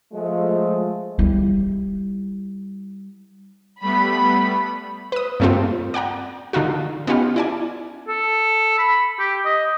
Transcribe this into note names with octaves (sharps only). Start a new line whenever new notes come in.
F3 G#3 A3
G3 E4
G3 A3 B3 B5
B4 D#6
G2 C#3 A3 A#3 C4 F4
D5 F#5 G5 A#5
D3 D#3 D#4 F4 F#4
B3 C#4 D#4 F4 G4
E4 D5 G#5
A4
B5
G4
D#5